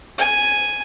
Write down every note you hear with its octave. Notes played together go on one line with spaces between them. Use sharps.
G#5